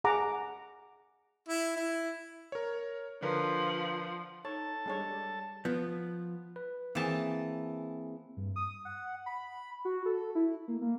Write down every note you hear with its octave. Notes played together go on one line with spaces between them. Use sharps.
G#4 F#5 A#5 D6
E4
E4
A#4 C#5
D3 F3 A#4 B4
D#4 A4 C#5 A5
G3 G#3 D4 C#5
F3 B3
B4
E3 A#3 C4 G#4 A5
G2
D#6
F#5
B5
F#4
A4
E4
A#3
A#3